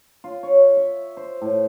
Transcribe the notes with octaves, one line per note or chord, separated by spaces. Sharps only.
F4
C#5
E5
C5
A2